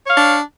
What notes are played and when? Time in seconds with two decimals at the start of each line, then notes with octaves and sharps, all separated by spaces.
0.05 C#5
0.10 F5
0.15 D4